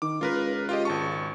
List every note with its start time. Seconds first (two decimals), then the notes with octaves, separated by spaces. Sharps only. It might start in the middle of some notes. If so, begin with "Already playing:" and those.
0.02 D#3 D6
0.21 C#2 F4 A#4 B4
0.69 F4 G4 D#5
0.85 G#1 A5 C#6